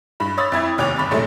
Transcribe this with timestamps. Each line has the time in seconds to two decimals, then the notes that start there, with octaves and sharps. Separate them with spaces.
0.20 G2 B5
0.37 C#5 B5 C6 D#6 E6 A6
0.52 F2 E4 G#6
0.78 F1 D#2 C#5 G5 D6 F7
0.96 G1 B5 C#6 A6
1.11 F1 A#1 F#3 A3 C6